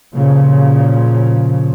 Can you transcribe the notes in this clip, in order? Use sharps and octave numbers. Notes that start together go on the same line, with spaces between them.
A#2 C#3 F3